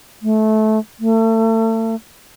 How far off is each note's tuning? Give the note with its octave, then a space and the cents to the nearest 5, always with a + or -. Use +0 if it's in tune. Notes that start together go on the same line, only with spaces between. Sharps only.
A3 -20
A3 +35